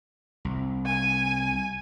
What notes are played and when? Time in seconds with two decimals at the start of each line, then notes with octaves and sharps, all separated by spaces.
0.45 C2
0.86 G#5